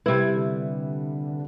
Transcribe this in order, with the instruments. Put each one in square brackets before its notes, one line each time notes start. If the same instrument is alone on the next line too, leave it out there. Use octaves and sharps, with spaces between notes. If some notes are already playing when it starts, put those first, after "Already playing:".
[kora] C3 E4 [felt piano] G3 B4 [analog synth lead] G#6
[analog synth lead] D3